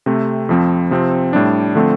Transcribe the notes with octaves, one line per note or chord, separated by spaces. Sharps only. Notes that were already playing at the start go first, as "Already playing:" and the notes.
C3 A3 C4
F2 F3 C4
C3 F3 C4
A2 G3 D4
D3 F3 A3 C4